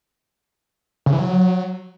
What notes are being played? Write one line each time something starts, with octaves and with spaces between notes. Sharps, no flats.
C#3
E3
F#3